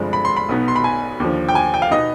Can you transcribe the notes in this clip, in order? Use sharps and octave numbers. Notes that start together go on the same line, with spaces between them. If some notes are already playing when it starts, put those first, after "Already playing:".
Already playing: G1 G2 F3 G#3 C4
B5
C6
B5
B1 B2 B3 D#4
C6
B5
G#5
D#2 D3 F3
G5
G#5
G5
F5
B2 B3 D#4 D#5